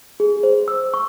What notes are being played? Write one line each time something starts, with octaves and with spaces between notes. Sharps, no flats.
G#4
C5
E6
C#6